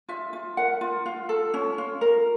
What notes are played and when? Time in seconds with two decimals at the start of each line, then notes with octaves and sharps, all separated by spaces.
0.09 F4 E5
0.33 F4
0.57 A#4 F#5
0.81 F4
1.06 F4
1.29 A4
1.54 C#4
1.78 F4
2.01 A#4